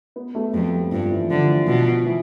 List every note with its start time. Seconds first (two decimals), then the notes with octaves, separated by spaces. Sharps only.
0.16 B3
0.35 A3
0.54 F2 A3
0.72 G3
0.92 G2 F3
1.11 E3
1.30 D3 F3
1.49 E3
1.67 B2 F3
2.05 E3